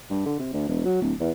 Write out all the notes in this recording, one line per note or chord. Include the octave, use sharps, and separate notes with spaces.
G2
D3
C3
D2
E1
F#3
D1
E2